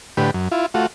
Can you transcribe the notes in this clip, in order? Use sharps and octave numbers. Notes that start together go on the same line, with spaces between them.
A2 D3 G4 B4
F#2
E4 F4
A3 F4 F#4